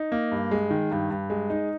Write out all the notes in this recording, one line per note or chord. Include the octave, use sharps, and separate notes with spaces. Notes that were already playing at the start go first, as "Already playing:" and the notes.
Already playing: D#4
A#3
G2
G#3
D#3
G2
G2
G#3
D#4